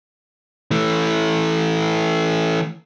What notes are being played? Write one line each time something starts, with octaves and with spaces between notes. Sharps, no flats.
E3 A3